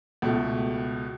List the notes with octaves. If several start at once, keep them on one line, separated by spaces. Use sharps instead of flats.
C#2 B2 A3